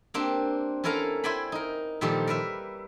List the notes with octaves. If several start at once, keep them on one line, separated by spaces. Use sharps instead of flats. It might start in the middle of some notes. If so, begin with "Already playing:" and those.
A#3 C4 D4 G4
C#4 E4 A4 A#4 F5 A#5
E4 C5 D5 G5 G#5 B5
D#4 A#4
A#2 D#3 F3 G3 G4 A4
A#4 B4 E5